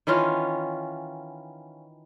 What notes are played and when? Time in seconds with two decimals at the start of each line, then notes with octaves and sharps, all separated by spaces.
0.07 D#3 E3 C#4 F4